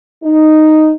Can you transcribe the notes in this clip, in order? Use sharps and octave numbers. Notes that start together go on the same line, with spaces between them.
D#4